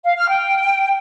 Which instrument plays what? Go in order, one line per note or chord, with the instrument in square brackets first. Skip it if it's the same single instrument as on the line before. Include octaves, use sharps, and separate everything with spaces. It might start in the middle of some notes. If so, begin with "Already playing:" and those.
[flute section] F5
F6
G5